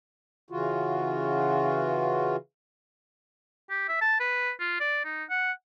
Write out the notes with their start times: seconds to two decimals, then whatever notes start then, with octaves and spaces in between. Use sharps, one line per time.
0.50 C#3 E3 F4 F#4
3.70 G4
3.88 E5
4.01 A5
4.20 B4
4.60 F4
4.80 D5
5.05 D#4
5.30 F#5